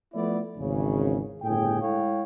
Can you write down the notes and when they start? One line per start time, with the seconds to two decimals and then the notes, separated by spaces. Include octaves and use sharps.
0.14 F3 A3 B3 E4 D5
0.58 G#1 E2 C#3
1.43 G1 A2 C#3 G#4 G5
1.81 G#3 E4 A4 C#5 F5 G5